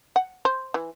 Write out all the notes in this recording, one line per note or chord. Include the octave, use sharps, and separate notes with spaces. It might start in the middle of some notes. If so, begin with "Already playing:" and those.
F#5
C5
E3